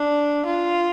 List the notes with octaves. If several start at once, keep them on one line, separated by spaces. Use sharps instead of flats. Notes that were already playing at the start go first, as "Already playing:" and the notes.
Already playing: D4
F4